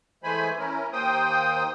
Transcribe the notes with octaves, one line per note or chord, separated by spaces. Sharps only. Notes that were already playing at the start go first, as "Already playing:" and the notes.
E3 G#3 A3 C5 G#5 B5
C#4 E4 A#4
D#2 A#3 C5 G5 D#6